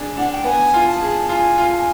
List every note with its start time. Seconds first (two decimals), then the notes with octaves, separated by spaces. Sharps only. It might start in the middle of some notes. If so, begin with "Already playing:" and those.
Already playing: D4 G#4
0.17 D4 F#5
0.32 G5
0.44 B3 G#5
0.74 F4
0.88 A5
1.01 G#4
1.29 F4 A5
1.34 G#5
1.58 F4
1.72 A5
1.77 G#5